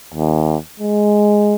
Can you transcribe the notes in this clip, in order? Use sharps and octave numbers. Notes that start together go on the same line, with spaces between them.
D#2
G#3